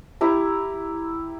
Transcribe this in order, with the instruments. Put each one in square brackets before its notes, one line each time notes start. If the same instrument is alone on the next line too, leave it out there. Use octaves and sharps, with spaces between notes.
[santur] E4 G4 A#5